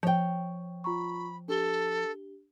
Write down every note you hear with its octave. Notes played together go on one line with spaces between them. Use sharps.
F3 C#5 G5
F4 A#5 B5 C#6
D4 G4 A4 G7